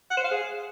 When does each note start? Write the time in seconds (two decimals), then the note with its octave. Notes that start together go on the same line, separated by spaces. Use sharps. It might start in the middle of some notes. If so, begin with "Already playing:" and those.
0.11 F#5
0.17 C5
0.24 F5
0.31 G#4